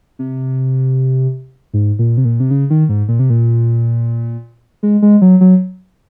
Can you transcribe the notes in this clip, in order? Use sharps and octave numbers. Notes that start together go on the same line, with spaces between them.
C3
G#2
A#2
C3
A#2
C3
C#3
D#3
G#2
A#2
C3
A#2
G#3
G#3
F#3
F#3